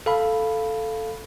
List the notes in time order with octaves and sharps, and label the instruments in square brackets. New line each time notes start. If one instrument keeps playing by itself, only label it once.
[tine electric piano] A4 F5 B5